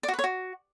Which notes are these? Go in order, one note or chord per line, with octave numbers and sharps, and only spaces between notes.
D5
F#4
B4
C#5
F#4